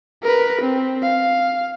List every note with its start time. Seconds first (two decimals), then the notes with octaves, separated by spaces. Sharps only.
0.23 A#4 B4
0.62 C4
1.03 F5